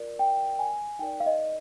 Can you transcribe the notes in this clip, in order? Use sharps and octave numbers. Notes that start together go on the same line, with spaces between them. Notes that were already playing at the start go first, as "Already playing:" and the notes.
Already playing: F4 A#4 D5
G5
G#5
D#4 A#4 D5 G5
F5
D#5